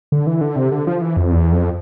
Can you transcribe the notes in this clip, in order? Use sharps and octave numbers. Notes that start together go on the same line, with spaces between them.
D3
E3
D3
C3
D3
F3
E3
F2
E2
F2